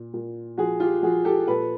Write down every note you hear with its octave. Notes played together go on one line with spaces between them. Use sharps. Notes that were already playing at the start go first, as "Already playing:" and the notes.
Already playing: A#2
A#2
F3 F#4 G#4
F4 G4
F3 F#4 G#4
G4 A4
A#2 A4 B4